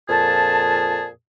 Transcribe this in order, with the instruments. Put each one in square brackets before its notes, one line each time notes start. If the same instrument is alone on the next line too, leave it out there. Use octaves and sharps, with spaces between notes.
[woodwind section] F2 A#2 G#4 A5